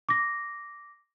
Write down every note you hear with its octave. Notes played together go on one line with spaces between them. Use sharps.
D6 A#6